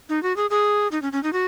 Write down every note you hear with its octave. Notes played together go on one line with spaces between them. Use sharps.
D#4
F#4
G#4
G#4
D#4
C#4
C#4
D#4
F#4